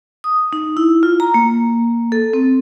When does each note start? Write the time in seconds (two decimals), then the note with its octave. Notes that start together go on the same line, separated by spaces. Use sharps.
0.24 D#6
0.53 D#4
0.77 E4
1.03 F4
1.20 A#5
1.34 A#3
2.12 A4
2.33 C4